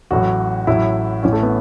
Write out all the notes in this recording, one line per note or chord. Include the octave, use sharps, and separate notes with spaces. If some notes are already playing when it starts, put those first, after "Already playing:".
A1 A2 F#3 F#4
A1 A2 F#3 E4
A1 A2 E3 C#4
A3
B3